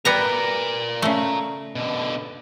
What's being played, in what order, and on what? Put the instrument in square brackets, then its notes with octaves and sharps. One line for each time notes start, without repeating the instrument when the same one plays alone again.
[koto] G3 B3 A#5 [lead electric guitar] A#4 D5
[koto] C#3 A3
[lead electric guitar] B2 D3